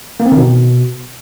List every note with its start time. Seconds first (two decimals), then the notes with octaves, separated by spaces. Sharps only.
0.20 A#3
0.26 C4
0.32 D#3
0.38 B2